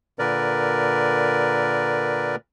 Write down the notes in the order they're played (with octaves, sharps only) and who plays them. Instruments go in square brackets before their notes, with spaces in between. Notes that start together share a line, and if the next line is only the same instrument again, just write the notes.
[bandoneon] A#2 D3 A#4 B4 D5